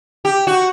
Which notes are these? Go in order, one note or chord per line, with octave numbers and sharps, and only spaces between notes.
G4
F#4